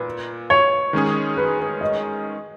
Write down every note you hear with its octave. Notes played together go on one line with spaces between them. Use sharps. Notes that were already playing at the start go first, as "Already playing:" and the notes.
Already playing: A#2 B4
C#5
D#3 G#3 C#4 G#4
B4
B4
D#5